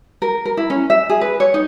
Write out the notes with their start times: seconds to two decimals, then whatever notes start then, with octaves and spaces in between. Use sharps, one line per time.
0.22 A#4
0.46 A#4
0.57 E4
0.70 C#4
0.90 E5
1.10 G#4
1.21 B4
1.40 C#5
1.54 D#4